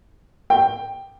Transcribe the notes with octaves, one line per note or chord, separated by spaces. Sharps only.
G5